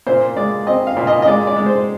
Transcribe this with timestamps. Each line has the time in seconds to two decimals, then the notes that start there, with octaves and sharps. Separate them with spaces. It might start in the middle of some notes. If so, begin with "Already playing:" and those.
0.07 A#2 C5
0.36 G#3 D5
0.67 C4 D#5
0.87 F5
0.97 A#2
1.07 D#5
1.22 D#5
1.26 G#3 D5
1.47 D5
1.56 G#3
1.66 C5